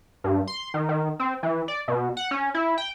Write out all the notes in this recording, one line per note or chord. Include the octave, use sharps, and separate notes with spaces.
G2
C6
D#3
D#3
C4
E3
D5
B2
F#5
C#4
E4
G5